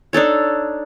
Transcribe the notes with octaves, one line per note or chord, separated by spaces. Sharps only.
D4 D#4 A4 C#5